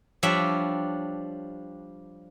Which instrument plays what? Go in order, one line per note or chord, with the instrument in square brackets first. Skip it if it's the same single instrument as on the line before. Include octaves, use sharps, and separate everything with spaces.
[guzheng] F3 G3 D4 C#5 E5